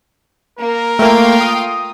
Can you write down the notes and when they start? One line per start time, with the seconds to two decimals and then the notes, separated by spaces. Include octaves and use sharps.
0.59 A#3 A#4
0.99 A3 A#3 F4 F5 G5
1.41 D#6